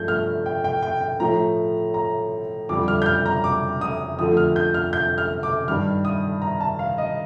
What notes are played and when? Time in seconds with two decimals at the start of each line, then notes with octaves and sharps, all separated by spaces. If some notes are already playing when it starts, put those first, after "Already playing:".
Already playing: G2 F3 A3 G6
0.08 F6
0.46 G5
0.64 G5
0.83 G5
1.01 G5
1.20 A2 F3 A3 A#5
1.94 A#5
2.69 F2 D3 G3 D6
2.88 F6
3.02 G6
3.06 F6
3.26 A#5
3.44 D6
3.81 D#6
4.18 F2 D3 F3 A3 D#6
4.37 F6
4.56 G6
4.74 F6
4.93 G6
5.18 F6
5.43 D6
5.68 G2 D#3 G3 F6
6.05 D#6
6.42 A#5
6.61 A5
6.79 F5
6.98 D#5